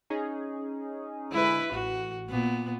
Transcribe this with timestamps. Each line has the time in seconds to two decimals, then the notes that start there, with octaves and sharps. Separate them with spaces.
0.10 C#4 D#4 G#4
1.32 D3 G#3 E4 B4
1.72 A1 F#4
2.29 A#2 B3